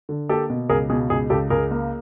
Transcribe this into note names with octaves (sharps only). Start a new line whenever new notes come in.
D3
A#3 G4 A4
B2
C#2 G#4 A#4
B2 G#4
C#2 G#4
C#2 G4 A4
C#2 G#4 A#4
A#3